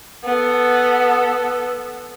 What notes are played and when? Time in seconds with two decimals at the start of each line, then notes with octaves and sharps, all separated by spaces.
0.24 B3 A4